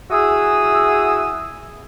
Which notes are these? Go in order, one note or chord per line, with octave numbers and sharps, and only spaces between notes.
E4 F#4 G#4 D#6 E6